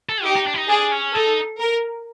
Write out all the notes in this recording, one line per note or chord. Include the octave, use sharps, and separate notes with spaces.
A4
D#4 G4
D#4
D4
E4
D#4
D4 G#4
C#4
D#4 A4
A#4